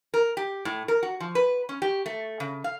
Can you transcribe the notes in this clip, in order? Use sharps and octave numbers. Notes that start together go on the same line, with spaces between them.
A#4
G4
A2
A#4
F#4
F3
B4
C#4
G4
A3
C#3
F5